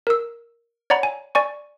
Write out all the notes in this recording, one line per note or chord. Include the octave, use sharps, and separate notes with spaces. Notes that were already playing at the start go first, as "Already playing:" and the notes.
A#4 E6
C#5 D5 F#5 A#5 B5
G#5
D5 G#5 C#6